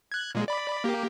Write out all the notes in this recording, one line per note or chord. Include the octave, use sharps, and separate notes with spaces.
F#6 G#6
A#2 G#3
D5 B5
A#3 G4